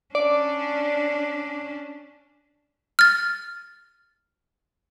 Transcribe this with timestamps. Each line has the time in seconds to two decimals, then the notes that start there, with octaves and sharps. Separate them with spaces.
0.15 C#4 D4 D5
2.99 F6 A6